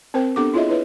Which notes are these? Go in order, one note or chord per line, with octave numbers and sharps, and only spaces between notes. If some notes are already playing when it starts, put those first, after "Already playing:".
C4 A#4 C5 G5
B3 D4 G4 A4 D6
E4 F4 G#4 C#5 D#5 E5
E4 B4 C#5 E5